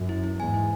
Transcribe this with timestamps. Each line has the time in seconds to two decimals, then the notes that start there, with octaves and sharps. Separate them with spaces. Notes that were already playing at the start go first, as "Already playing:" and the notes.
Already playing: F#2
0.09 E4
0.24 E4
0.38 E2 G#2 G#5
0.54 E4